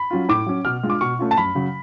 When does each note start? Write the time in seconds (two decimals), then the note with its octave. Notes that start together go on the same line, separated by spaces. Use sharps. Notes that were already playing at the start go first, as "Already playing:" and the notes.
Already playing: B5
0.11 F#3 C#4 F4
0.29 A2 D6
0.46 F#3 C#4
0.65 B2 F6
0.83 G#3 D4 F4
0.90 D6
1.01 B2 C#6
1.19 A3 C#4 F4
1.31 A5
1.38 F#2 B5
1.55 C#3 F#3